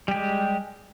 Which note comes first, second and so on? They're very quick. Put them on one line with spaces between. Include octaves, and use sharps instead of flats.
G3 G4 G#3